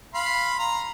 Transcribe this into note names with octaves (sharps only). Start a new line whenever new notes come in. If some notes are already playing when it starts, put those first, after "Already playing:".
F5 B5 C6
A#5